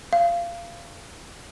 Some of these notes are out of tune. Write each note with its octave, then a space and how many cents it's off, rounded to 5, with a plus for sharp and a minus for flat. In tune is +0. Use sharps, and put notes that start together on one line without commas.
F5 -20